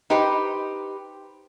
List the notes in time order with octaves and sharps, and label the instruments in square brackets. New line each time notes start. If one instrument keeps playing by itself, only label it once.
[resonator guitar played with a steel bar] D#4 G4 B4 C5